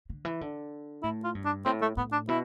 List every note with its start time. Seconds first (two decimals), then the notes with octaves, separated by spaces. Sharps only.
0.10 D3
0.25 E3
0.41 D3
1.03 A2 E4
1.24 F4
1.35 G2
1.45 D4
1.65 A2 C4
1.82 A3
1.97 A2 B3
2.12 D4
2.28 B2 E4